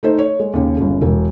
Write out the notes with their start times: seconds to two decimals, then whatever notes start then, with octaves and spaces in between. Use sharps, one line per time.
0.03 A3 D#4 C5
0.19 C#5
0.40 G#3
0.53 D#2 C#3
0.77 G1 C#3
1.01 E1 A#4